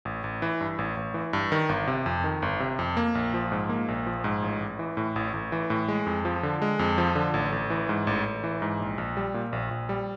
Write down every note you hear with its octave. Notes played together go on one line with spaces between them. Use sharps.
A1
A1
E3
G2
A1
A1
E3
G2
D#3
G1
C3
F2
D#3
G1
C3
F2
A#3
A#1
F3
G#2
A#3
A#1
F3
G#2
A1
A1
E3
A2
A1
A1
E3
A2
G#3
F2
F3
D3
G#3
F2
F3
D3
A1
A1
E3
G#2
A1
A1
E3
G#2
A#1
A#1
G3
A#2
A#1
A#1
G3